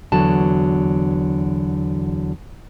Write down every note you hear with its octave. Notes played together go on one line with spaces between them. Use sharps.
E2 D3 F#3 F#4 A5